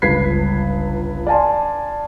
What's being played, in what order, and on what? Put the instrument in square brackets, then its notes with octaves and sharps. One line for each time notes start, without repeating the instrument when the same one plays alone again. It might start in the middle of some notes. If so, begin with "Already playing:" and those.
[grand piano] G1 C#2 B4 G#6 B6 C7
D5 F5 G#5 A5 C6